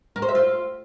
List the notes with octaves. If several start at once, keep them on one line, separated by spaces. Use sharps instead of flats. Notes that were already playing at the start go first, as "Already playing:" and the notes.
A#4
C5
E5
F4